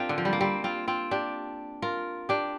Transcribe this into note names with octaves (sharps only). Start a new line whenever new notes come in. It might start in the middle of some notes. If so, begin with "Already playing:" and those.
Already playing: C4 D4 F4 G4 A#4
D3
F3
G3
A#3
G3 C4
C4 F4
C4 F4
D4 G4
F4 A#4
D4 G4